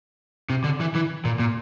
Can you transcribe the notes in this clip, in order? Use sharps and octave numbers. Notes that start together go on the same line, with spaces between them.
C3
D3
E3
E3
A#2
A#2